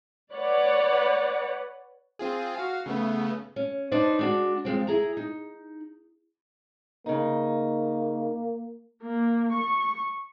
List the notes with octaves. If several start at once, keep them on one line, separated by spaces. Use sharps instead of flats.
B4 C#5 D5 F#5
C4 F4 G#4
F#4 F5
C#3 A3 B3
C#4
D4 D#4 B4 C5
G#3 D4 F#4
F3 G#3 C4
E4 G#4 A#5
D#4
C#3 A#3 D#4
A#3
C#6